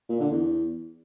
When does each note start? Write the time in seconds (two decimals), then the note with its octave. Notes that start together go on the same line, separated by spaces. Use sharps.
0.09 A#2
0.20 D3
0.31 E2